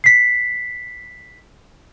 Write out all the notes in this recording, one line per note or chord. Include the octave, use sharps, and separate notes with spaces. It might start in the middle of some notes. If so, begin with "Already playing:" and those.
B6 C7